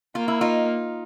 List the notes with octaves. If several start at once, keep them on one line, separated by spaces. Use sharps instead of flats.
A#3 F4
E4
D#4 F4